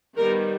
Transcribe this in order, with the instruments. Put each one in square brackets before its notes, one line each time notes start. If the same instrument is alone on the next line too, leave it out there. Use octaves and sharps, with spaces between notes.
[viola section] D#3 G3 B3 A#4